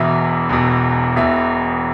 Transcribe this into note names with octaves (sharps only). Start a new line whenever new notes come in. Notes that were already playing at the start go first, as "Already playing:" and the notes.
Already playing: E1 E2 B2 E5
E1 E2 B2
E1 E2 B2 E5